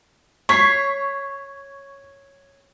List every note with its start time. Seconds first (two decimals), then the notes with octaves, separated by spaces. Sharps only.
0.49 C#5 C#6 B6 C7